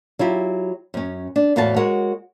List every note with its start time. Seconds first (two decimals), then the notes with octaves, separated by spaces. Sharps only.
0.19 F#3 E4 F4 G4
0.94 F#2 C#4
1.36 D4
1.56 E2 A2 E3 F#4 F5 A5
1.76 G#3 F#4 A#4 C#5 F#5